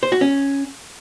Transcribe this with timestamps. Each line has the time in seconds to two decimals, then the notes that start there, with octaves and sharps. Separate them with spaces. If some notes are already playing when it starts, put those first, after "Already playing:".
0.03 C5
0.12 F#4
0.21 C#4